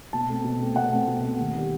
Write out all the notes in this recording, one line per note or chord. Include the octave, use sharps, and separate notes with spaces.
B2 A5
A3 C4
B2
A3 C4
B2 F#5
A3 C4
B2
A3 C4
D#2
D#3 G3